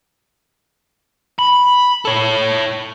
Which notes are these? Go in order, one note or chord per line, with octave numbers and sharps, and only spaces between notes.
B5
A4 C#5